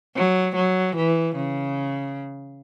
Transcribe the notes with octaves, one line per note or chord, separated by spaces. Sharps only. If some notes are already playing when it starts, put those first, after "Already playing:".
F#3
F#3
E3
C#3